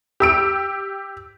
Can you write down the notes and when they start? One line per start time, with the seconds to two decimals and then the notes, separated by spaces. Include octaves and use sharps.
0.20 G4 E6 D7